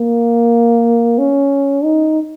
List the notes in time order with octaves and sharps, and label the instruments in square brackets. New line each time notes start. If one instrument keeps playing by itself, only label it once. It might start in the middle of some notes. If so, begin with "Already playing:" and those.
Already playing: [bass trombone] A#3
C#4
D#4